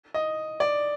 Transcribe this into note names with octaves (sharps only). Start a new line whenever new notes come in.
D#5
D5